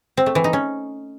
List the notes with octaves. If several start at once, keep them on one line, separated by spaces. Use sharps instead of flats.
C4
A3
E3
D#4
C#4